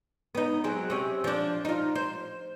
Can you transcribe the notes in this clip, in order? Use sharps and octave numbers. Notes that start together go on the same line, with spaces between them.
B3 D#4
F#3 G#3 C4
C3 C#4
F3 D4
D#4 F4
C5